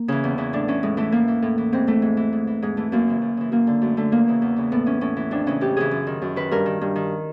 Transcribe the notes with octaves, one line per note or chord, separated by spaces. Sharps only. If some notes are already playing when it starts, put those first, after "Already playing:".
Already playing: A#3
C#3 E3
E2
C#3 E3
A2 D4
E3 C#4
A2 G#3
E3 A3
A2 A#3
E3
A2
E3
G#2 C4
E3 A3
G#2
E3
G#2
E3
G#2 G#3
E3 A3
F#2 A#3
C#3 E3
F#2
C#3 E3
F#2 A#3
D3
F#2 A3
D3 A3
E2 A#3
C#3 E3
E2
C#3 E3
A2 B3
E3 C#4
A2 C#4
E3
F2 D4
C#3 E3 C#4
F2 G4
C#3 E3 G#4
F#2
D#3
F#2
D#3 B4
G2 A#4
D#3
G2
D#3